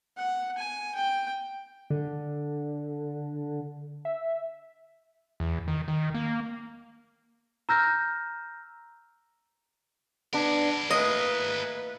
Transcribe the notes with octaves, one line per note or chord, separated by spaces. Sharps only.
F#5
G#5
G5
D3
E5
E2
D#3
D#3
A#3
A#5 E6 F6 G6 A#6
B3 D4 G#4 A#4
A2 A#3 B4 D#5